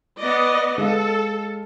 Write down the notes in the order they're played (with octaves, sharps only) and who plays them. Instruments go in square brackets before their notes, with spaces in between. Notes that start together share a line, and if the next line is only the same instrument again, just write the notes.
[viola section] B3 D5 D#5
[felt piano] G#3 F5 [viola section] A4